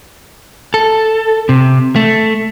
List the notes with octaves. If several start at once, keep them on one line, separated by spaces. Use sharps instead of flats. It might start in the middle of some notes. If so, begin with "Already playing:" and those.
A4
C3
A3